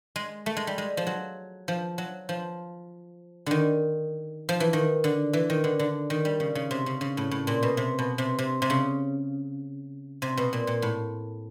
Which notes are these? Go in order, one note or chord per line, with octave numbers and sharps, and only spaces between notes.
G#3
A3
G#3
G3
G#3
F3
F#3
F3
F#3
F3
D3 D#3
F3
E3
D#3
D3
E3
D#3
D3
D3
D#3
G3
C#3
C#3
C3
C#3
C#3
A2
A2
A#2
B2
C3
B2
C3
C3
C3
C#3
C3
B2
A#2
A#2
A2